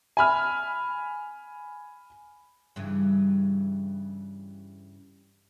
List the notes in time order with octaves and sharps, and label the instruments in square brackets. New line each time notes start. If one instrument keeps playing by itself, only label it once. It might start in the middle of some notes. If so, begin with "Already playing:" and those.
[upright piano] G#5 B5 F6
[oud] G2 C#3 E3